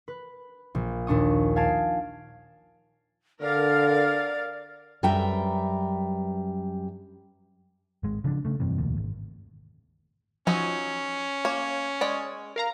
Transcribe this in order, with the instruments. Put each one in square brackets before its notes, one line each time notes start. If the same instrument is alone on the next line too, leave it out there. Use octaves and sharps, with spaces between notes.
[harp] B4
A#1
D#2 A#2 D4 C#6 D#6
F5 G#5 A5 C7 D7
[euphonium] D3 [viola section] A#4 F5 [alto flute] D5
[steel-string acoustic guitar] F#2 G3 B4 E5 G5 A#5
[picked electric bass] G#1 G#3
C#3 F3 C#4 D4
C#3 A3
F1 G2 C3 E3
E1 D2 A#2
G#1
[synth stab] F3 [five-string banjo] F#3 D#4 [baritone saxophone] C#4
[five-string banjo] A#3 C#5
G#3 C#5 D5
[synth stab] A#4 F5 A#5